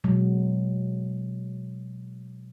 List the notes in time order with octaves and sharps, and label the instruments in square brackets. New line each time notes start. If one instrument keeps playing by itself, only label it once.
[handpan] B2 F#3 G#3